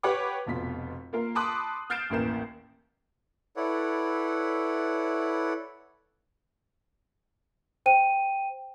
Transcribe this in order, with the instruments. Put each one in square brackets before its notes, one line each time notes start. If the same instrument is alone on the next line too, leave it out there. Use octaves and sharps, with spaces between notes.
[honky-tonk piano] G4 B4 C#5 F#5 B5 D6
F1 B2 F4 B6
A#3 F4 A#4 F5
A5 B5 C6 D6 D#6 F#6
F6 G6 A6 C7 D7 E7
A1 D#2 E3 A#4 C7 E7
[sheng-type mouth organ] E4 A4 B4 C#5 D5 F#5
[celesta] C5 G5 D#7